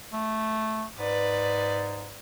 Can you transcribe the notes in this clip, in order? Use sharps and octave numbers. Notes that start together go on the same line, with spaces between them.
A3
G#2 B4 D5